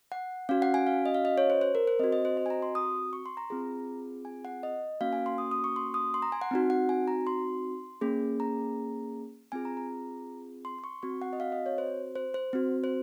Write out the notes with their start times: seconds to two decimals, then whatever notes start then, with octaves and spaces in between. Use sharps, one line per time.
0.12 F#5
0.49 C#4 F#4 F5
0.62 F#5
0.74 G#5
0.87 F5
1.06 D#5
1.14 F5
1.25 D#5
1.38 C#5
1.50 C5
1.61 C5
1.75 A#4
1.87 C5
1.99 C4 F#4 D#5
2.12 D#5
2.25 C5
2.37 D#5
2.46 G#5
2.50 A#5
2.62 C6
2.75 D#6
3.13 C#6
3.26 C6
3.37 A#5
3.50 C4 F4 G#4
4.25 G#5
4.45 F#5
4.63 D#5
5.01 A#3 C#4 F#4 F5
5.13 G#5
5.26 C6
5.38 D#6
5.51 D#6
5.64 C#6
5.76 C6
5.94 D#6
6.14 C6
6.22 A#5
6.32 G#5
6.41 F#5
6.51 C4 D#4 F#4
6.70 F#5
6.89 G#5
7.08 A#5
7.27 C6
8.01 A#3 C#4 G#4
8.40 A#5
9.52 C4 F4 G#4 G#5
9.65 A#5
9.77 A#5
10.65 C6
10.79 C6
10.84 C#6
11.03 C4 F#4 C#6
11.22 F#5
11.33 D#5
11.40 F5
11.52 D#5
11.66 C#5
11.78 C5
12.15 C5
12.34 C5
12.53 C4 F#4
12.84 C5